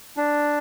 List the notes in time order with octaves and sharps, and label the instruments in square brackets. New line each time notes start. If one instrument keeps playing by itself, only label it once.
[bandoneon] D4